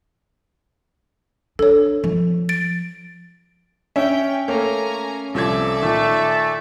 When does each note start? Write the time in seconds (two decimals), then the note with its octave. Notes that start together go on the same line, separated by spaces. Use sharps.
1.59 D4 A4 C#5
2.04 F3
2.49 A6 D7
3.96 C#4 E5 G5
4.48 A3 A#3 C#5 G#5 A#5
5.34 C2 F3 A4 D5 E5 G#6
5.82 A#2 D#3 A3